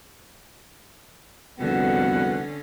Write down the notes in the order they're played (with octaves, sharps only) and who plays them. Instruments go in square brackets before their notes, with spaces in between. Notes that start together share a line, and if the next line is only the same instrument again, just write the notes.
[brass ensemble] C2 F2 F#5 [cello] D3 C#4 [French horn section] B3 F#4